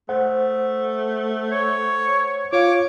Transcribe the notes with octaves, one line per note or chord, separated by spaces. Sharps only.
A3 C5 F#5
C#5
F4 C#5 F5 D6